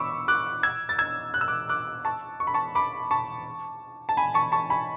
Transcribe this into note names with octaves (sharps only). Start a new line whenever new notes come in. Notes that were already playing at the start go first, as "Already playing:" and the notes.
Already playing: B5 C#6 D6 E6
D6 F#6
E6 G#6
A6
E6 G#6
F#6
E6
D6 F#6
D6 F#6
A5 C#6
C#6
B5
A5 C#6
B5 D6
A5 C#6
A5
G#5 B5
A5 C#6
A5 C#6
G#5 B5